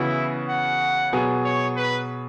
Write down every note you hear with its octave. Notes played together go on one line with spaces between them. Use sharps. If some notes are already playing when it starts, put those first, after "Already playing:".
Already playing: C#3 E3 B3 E4 F#4
F#5
B2 F#3 B3 G#4
C#5
B4